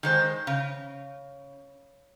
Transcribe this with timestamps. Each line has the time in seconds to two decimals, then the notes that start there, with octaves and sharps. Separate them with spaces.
0.03 D#3 G#3 C5
0.47 C#3